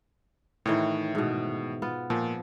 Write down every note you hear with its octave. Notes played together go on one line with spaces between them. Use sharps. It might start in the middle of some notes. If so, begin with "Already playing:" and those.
A2 D#3 E3 C#5
G#2 B2
B3 F4
A#2 F3